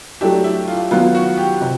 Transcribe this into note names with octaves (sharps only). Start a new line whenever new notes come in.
F#3 A3 D4 E4 G4
E4
F4
D#3 F#3 B3 F4
F#4
G4
C3